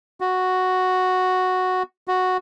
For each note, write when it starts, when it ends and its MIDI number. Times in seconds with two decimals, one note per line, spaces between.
0.21 1.83 66
2.08 2.37 66